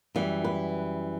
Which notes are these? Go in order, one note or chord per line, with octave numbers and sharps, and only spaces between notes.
F#2 E3 G3
B4